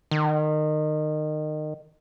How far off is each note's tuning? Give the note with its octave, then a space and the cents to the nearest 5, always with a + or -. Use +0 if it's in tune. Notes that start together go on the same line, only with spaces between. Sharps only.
D#3 -25